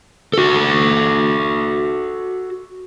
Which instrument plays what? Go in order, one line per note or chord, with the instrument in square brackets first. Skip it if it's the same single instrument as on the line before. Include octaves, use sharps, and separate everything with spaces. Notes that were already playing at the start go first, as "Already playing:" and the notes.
[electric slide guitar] F#4 A4